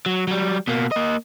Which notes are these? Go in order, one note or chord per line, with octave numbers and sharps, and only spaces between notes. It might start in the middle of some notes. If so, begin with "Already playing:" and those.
F#3
F#3 G3
B2 A#3
A#3 D#5